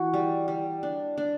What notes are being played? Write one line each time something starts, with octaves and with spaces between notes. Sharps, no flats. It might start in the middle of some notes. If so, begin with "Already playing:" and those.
Already playing: E3 F#4
G3
G3
D4
D4